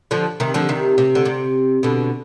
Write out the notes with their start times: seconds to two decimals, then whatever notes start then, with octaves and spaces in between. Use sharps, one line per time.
0.11 D3 F3
0.40 C3 D#3
0.54 D3 F3
0.69 C3 D#3
0.98 C3
1.15 D3
1.25 C3
1.83 B2 D3